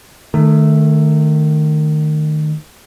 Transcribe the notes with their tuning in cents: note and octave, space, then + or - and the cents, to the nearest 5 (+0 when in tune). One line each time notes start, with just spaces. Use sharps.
D#3 -25 A3 +0